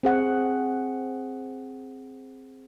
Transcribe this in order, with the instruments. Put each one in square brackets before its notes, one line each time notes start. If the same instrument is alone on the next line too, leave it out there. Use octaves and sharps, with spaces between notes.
[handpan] C4 G#4 F#5